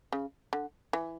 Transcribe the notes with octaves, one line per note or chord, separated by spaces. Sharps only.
C#3
D3
E3